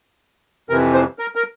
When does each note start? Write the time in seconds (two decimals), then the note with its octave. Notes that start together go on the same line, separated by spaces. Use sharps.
0.70 F2 C3 E3 A#4
0.94 C5
1.19 A#4
1.35 A#4